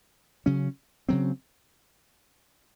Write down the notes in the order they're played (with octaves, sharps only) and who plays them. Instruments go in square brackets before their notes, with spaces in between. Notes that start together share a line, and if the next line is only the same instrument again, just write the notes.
[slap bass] C#3 F#3 C#4
C#3 F#3 C4